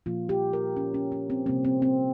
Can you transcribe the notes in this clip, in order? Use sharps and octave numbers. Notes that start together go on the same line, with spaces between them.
A#2 F3 A#3 F4
G4
A#4
C#4
C#4
C#4
C4
C3 G3 A#3 C4
C4
C4